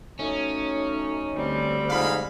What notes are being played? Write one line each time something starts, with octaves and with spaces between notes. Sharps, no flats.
F#3 A3 C#4 D#4
D2 G3 C4
F2 G#2 F5 B5